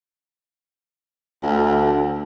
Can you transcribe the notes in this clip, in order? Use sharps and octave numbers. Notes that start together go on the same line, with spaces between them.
D2